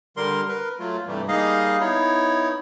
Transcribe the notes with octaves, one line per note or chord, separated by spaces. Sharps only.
D3 G3 A#4 C6
A#4 B4
F#3 A3 F4
G2 C3 E3 G3 A3
G3 A#3 D#4 G#4 D#5 F5
B3 D#4 E4 C#5